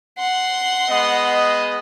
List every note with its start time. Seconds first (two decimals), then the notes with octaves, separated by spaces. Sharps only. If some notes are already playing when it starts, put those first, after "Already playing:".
0.18 F#5 C6
0.89 G#3 B3 D#5